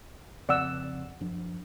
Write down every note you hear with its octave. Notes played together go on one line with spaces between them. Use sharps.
F2 C#3 C4 D5 F#5 E6
F#2 F3 D4